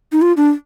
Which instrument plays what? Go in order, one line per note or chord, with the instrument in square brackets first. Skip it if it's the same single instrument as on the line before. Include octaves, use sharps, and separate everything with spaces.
[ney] D#4
F4
D4